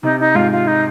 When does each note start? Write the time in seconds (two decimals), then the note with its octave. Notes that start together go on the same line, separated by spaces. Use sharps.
0.03 C3 D#4
0.20 D#4
0.35 G#2 F4
0.52 F4
0.67 D#4